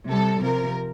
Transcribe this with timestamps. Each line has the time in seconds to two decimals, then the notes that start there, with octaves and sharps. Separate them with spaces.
0.10 C3 G3 A4
0.41 C3 F3 A#4